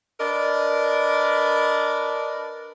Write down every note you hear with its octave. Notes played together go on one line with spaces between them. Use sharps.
D4 A#4 B4 D5 D#5